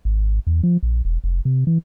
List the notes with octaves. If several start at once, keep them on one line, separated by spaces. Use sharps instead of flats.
G#1
E2
F3
A#1
E1
F1
C3
E3